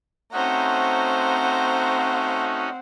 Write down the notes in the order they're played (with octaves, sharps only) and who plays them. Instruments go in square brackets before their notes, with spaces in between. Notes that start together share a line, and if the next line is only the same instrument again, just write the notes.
[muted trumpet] A3 [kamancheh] C4 F#5 [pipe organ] C#4 D#4 F#4 [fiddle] C5 A#5